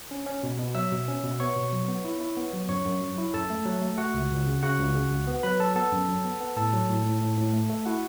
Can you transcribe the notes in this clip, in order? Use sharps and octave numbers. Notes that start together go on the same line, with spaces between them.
C#4
C#4
B2
B2
F#3 E5 E6
B2
C#4
B2
B3 C#5 C#6
B2
F#3
B3
E4
E4
B3
F#3
F#2 C#5 C#6
F#2
F#3
E4
F#2 A4 A5
A3
F#3
A3
A3 F#4 F#5
C#2
C#2
C#3
C#3 F#4 F#5
C#2
C#3
C#2
B3
F#3 B4 B5
F#3 A4 A5
B3 A4 A5
F#2
F#3
B3
B3
A2 A4 A5
F#3
A2
A2
A2
A2
A3
A3
E4 F#4 F#5